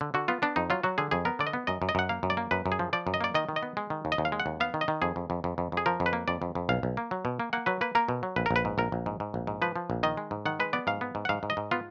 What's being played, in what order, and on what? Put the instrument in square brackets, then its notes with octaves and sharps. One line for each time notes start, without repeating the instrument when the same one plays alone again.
[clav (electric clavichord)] D3
D3 F#4
B3 F4
B3 D4
F2 D#4
F#3 F4
F#3 F#4
D3 G#4
F2 G#4
B3 A#4
D3 D5
D#5
B3
F#2 D#5
F#2
D#5
F#2 F#5
A#3 F5
F#2
D5
A#3
F#2 B4
F#2
G#4
F3
F3 D5
F#2
D#5
A#3 D5
D#3 D#5
D#3
D#5
B3
G#3
D#3
D#2
D#5
D#2
F5
G#3
F#5
D#2
B3 F5
D#3
D#5
D#3
F2 G#4
F2
F2
F2
F2
F2
G#4
F3 A#4
F2
B4
A#3
F2 D5
F2
F2
B1 F5
B1
A#3
F#3
B2
A#3
A#3 F#5
F#3 B4
A#3 B4
A#3 A#4
B2
F#3
A#1 B4
A#4
A#1
B4
G#2
A#1 A#4
A#1
G#2
G#2
A#1
G#2
F3 B4
F3
A#1
D#3 D#5
G#3
G#2
D#3 F#5
G#3 B4
B3 D5
G#2 F5
B3
G#2
F#5
G#2 F5
G#2
D#5
G#2
B3 F4